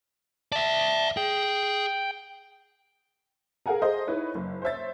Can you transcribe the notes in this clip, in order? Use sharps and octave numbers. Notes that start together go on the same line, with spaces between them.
D5 E5 A5
G#4 G5
G#4 A#4 F5 F#5 G#5 A#5
G#4 A4 C5 D#5
D#4 E4 B4 C#5
F#1
C5 C#5 E5 A6